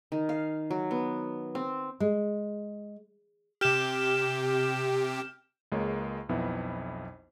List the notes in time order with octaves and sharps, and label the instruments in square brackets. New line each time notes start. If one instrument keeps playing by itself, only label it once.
[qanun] D#3
F5
F#3
B3
C4
[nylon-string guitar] G#3
[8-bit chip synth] C3 G4 [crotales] F6 G6 E7
[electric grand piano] C#2 G#3 A#3 C#5
B1 F2 B3 E4